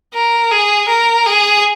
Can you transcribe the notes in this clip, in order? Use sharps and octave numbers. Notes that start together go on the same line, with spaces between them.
A#4
G#4
A#4
G#4